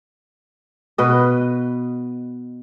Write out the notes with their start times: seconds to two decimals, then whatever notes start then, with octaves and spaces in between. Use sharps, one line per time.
0.98 B2 B4 D#5